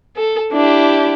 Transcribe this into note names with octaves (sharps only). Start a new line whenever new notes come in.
A4
D4 E4 G4